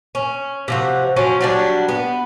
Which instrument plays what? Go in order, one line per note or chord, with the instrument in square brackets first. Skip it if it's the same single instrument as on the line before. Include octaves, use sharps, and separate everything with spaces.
[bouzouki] C#4
C3 F3 F#4
F3 F#3 C#4
F#3 G3 D4
B3